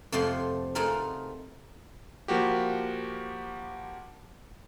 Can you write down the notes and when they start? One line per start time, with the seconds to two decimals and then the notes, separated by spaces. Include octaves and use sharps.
0.12 F2 C3 F3 A3 F#5 C6
0.75 A3 D#4 F4 G#4 A#4 F#5
2.28 F3 A#3 F#4 G4